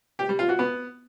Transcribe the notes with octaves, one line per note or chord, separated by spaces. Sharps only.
G4
G3
F4
F#4
B3